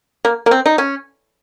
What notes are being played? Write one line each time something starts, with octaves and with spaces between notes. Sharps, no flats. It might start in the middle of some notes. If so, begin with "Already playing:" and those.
A#3
A#3
C4
D#4
C#4